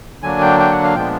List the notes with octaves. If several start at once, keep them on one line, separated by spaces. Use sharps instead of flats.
D3 F#3 A#3 D4 G#5
G5
G5
F#5
F5
A#2 F3 G#3 B3 D4 G5